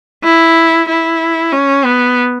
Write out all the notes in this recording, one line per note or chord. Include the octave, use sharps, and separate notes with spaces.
E4
E4
C#4
B3